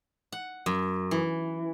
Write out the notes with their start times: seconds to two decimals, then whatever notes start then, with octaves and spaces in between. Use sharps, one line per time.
0.32 F#5
0.66 F#2
1.11 E3